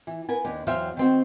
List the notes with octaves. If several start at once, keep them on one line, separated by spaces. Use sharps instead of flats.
E3
B3 A#4 G#5
D#2 D4
E2 F#3 C5 E5 F5 G5
D#3 C4 F#4